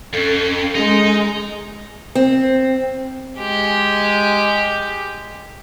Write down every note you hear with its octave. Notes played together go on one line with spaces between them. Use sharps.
F2 C#4 A4
G#3 D#4
C4
G#3 G4